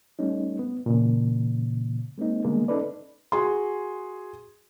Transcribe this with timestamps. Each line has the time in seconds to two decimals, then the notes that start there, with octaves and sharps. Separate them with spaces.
0.19 G3 A3 C#4 D#4
0.59 B3
0.86 A#2 C#3 E3
2.18 G#3 A#3 C4 D#4
2.44 D3 D#3 G3 G#3 A#3 B3
2.68 C#4 D#4 A4 B4 D5
3.32 F#4 G#4 C6